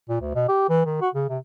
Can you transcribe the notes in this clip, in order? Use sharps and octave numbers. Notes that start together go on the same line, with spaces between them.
A#2
D2
B2
G4
E3
D#3
F#4
C#3
C3